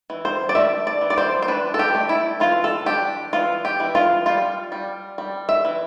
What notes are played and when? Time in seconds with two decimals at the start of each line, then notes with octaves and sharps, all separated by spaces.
0.10 E3
0.25 C5
0.49 D5
0.55 A3 E5
0.87 D5
1.01 E3
1.10 D5
1.18 C5
1.42 C5
1.48 D4 B4
1.74 A4
1.79 G4
1.95 A3
2.09 E4
2.40 E3 F4
2.64 A4
2.86 D4 G4
3.33 E3 F4
3.65 G4
3.80 E3
3.95 F4
4.26 G3 F4
4.72 G3
5.18 G3
5.49 E5
5.65 E3